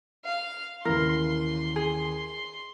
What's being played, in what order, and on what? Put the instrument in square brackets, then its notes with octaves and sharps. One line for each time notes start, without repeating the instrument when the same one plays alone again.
[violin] F5
[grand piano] D#2 C#3 E3 [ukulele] A#4 [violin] C6
[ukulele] G#4